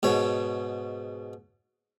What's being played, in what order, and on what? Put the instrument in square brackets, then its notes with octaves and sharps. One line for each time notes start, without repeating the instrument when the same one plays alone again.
[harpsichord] G#2 B2 C#5